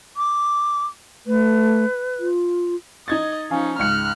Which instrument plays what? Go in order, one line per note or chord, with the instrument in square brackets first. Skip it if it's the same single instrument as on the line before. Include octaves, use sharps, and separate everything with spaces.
[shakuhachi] D6
[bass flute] A3 [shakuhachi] B4
[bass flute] F4
[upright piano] D#4 G#6 A6 [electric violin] D#5
[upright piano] F3 F5 G#5 [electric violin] C#4 D#4
[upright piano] C#2 G#2 C#7 [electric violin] F6 F#6